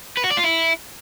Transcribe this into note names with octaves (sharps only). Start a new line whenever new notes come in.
B4
F#4
D5
F4
E4